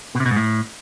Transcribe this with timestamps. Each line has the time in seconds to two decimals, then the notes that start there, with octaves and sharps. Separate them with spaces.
0.15 B2
0.20 C3
0.26 B2
0.31 G#2
0.36 A2